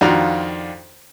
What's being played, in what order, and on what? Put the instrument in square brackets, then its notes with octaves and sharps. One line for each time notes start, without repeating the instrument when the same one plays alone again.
[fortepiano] F2 D#3 D4 F4 F#4 A#5